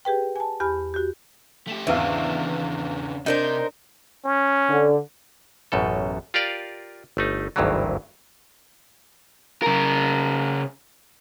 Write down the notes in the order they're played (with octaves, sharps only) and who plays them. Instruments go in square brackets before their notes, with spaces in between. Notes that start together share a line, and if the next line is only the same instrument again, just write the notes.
[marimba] G4 G#4 B4 G5
G#5 A5
E2 G4 G#5 B5 F6
F#4 G4
[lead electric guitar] A3 G4
[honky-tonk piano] G#1 E2 F5 [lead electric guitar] C#3 D4 [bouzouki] E3
[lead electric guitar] C3 [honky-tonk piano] D4 [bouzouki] D#4 A#4 C5
[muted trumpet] C#4
[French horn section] D3
[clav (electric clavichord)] A1 F#2 B2 A4
F4 G4 A#4 D5 F5
G1 A3 D#4
G#1 D2 G2 D#3 E3 F#3
[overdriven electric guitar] C#3 A#4